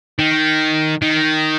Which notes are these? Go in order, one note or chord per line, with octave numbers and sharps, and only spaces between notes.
D#3
D#3